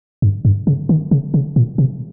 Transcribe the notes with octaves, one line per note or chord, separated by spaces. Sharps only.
G2
G2
C#3
D#3
C#3
C#3
A#2
C3